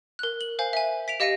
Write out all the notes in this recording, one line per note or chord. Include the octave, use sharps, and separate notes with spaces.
A#4 F#6
F#7
C5 F5 G#5
E5 G#5
B6 D7 F7
G4 D#5 F5 A#6 C#7 D#7